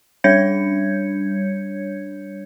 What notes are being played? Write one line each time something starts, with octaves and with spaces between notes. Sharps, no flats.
G3 D4 C#5 G6 G#6 C#7